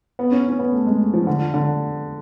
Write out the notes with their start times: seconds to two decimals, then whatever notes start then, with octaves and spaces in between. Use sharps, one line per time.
0.19 B3
0.32 C#4
0.49 C#4
0.59 B3
0.73 A3
0.87 G#3
1.14 F3
1.27 D3
1.54 D3